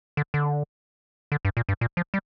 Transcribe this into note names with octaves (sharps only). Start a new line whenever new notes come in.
D3
D3
D3
G2
A#2
G2
A#2
F3
G3